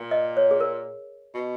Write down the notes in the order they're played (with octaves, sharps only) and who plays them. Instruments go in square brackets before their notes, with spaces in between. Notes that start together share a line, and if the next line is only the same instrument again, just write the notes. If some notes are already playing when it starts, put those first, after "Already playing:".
Already playing: [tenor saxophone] A#2
[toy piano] D#5
C#5
G#4
A#4
[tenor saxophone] B2